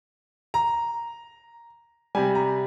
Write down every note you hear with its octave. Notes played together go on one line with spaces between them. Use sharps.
A#5
C3 G3 G#5
A#5